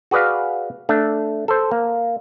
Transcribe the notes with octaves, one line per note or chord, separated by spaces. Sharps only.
F#4 G#4 B4 D5 F5
A3 D4
A4 C5
A#3